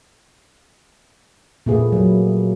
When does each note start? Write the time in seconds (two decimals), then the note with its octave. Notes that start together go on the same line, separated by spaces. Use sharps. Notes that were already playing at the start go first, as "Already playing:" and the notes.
1.66 A#2 A3 A#3 G#4 B4
1.92 F#3